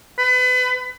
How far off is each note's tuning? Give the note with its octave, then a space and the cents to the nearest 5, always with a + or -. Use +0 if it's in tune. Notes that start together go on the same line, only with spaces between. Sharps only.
B4 +30